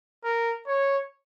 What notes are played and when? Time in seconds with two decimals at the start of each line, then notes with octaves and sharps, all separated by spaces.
0.23 A#4
0.67 C#5